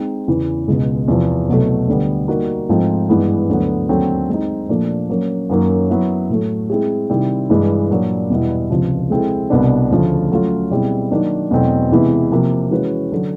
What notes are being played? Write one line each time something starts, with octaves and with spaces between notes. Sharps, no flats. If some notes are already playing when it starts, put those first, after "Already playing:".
Already playing: G#3 C4 D#4
E2 C#3 E3
C#2 B2 G#3
E2 C3 F3
C2 B2 F#3 A3
D2 D3 G3 B3
G3 A#3 D#4 F#4 A#4
G#2 F3 A3 C4 D#4
G2 E3 G#3 B3
D2 D3 F#3 B3
D#2 D3 F#3 A3 C4
G#3 C4 D#4
A#2 F3 A3 D4
F#3 A#3 C#4
F#2 D#3 F#3 A#3 C#4
F#3 B3 E4
A2 F#3 A3
G#3 C4 E4 G#4
C3 D#3 G3 C4 E4
G2 E3 G#3
A#2 F#3 A#3 D4
E2 B2 G3 B3 E4
C#2 C3 F3
G#3 C4 E4 A4
C2 B2 G3 B3 D4
D2 C#3 F3 A3
F#3 A3 C#4 F4
B2 G3 C4 E4 G#4
D#3 F#3 A#3 D4
E2 B2 F#3 A3 C4
C3 E3 G#3 B3 E4
C3 F3 A#3
E3 G#3 C#4 F#4 B4
D3 F#3